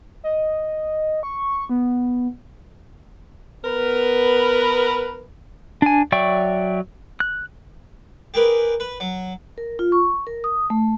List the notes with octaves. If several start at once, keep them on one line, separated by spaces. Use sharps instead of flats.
D#5
C#6
B3
B3 A#4 B4
D4 G#5
F#3 D5 E5 G5 C#6
F#6
G4 G#4 A#4 B4
B4
F#3
A#4
F4
C#6
A#4
D#6
A3